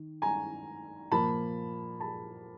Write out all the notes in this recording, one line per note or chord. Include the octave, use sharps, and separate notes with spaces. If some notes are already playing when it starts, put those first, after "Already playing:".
Already playing: D#3
G#5 A#5
A#2 F3 A#3 A5 B5
A5 B5